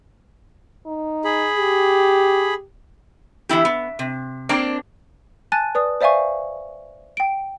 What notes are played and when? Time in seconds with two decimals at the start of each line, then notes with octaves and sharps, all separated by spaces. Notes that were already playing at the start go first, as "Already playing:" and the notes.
0.86 D#4
1.25 G#4 B5
1.57 G4
3.49 E3 B3 E4 G4
3.65 B3
3.99 C3
4.49 A#3 C4 D4 D5
5.52 G#5 A5 F#6 A6 D#7
5.75 B4 D5 D#6
6.01 C5 D5 E5 F5 G#5 C#6
7.17 G5 D7